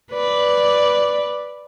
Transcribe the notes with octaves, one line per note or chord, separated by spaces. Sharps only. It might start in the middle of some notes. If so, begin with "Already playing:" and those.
B4 D5